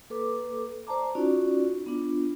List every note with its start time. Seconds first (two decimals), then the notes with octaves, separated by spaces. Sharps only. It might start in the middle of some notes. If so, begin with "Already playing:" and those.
0.10 A#3 A4 B4 D6
0.87 C5 D5 A5 A#5 D6
1.15 C#4 D#4 F4 F#4 D5
1.86 B3 D4 F4